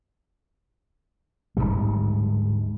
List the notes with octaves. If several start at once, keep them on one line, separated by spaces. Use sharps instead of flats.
D1 C#2 G#2 G3